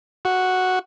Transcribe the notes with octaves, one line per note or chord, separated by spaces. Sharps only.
F#4